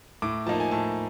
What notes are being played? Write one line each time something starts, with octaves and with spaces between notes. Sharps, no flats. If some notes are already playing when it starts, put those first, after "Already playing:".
A2 D6
F3 A#3 D#4 A5
G#5
A2 A5